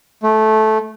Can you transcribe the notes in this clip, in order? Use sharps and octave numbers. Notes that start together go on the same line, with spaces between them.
A3